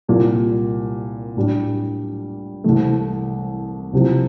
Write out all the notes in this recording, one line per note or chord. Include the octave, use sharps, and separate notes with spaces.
C2 A#2 G3
A2 G3 D4 G4
C2 C3 E3 A3
C2 C3 F3